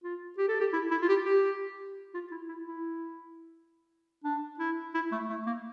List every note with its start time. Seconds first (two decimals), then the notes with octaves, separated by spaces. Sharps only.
0.03 F4
0.38 G4
0.48 A4
0.60 G4
0.73 E4
0.91 E4
1.02 F4
1.09 G4
1.25 G4
2.14 F4
2.31 E4
2.48 E4
2.67 E4
4.24 D4
4.59 E4
4.94 E4
5.12 A3
5.30 A3
5.46 A#3